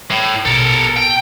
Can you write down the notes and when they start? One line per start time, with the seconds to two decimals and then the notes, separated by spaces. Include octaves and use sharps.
0.11 A2
0.46 A#1 B2 A4 A#4
0.96 G5